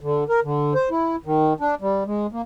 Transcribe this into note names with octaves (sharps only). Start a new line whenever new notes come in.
D3
A#4
D3
C5
E4
D#3
D4
G3
G#3
A#3